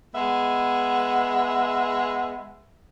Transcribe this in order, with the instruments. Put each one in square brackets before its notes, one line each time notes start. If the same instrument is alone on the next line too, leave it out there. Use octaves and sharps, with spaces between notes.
[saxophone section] G#3 B3 E5